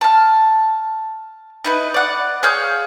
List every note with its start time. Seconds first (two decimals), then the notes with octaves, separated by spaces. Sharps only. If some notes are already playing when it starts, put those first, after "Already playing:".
0.01 A5 F6
1.65 D#4 E4 B4
1.94 D5 F#5
2.43 G#4 C#5 F5 G6